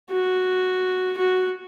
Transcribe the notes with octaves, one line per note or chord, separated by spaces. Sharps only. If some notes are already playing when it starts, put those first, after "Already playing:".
F#4
F#4